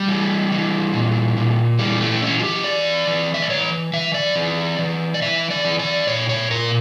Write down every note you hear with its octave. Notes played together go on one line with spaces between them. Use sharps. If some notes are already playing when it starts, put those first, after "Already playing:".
Already playing: G3
E3
E3
A#2
A#2
E3 G3
A3
E3 C#4
F4
G4
E3 D5
E3
E5
D5
E3 C#5
E3 E5
D5
E3
E3
D5
E3 E5
D5
E3
D5
A#2 C#5
C#5
A#2 A#4